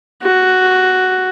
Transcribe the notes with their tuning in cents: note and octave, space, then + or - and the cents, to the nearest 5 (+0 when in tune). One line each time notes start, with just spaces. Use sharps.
F#4 +5